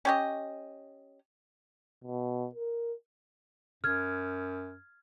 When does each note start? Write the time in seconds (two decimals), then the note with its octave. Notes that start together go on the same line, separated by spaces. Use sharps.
0.05 C#4 G4 D#5
2.04 B2
2.55 A#4
3.84 F#2 F6 G#6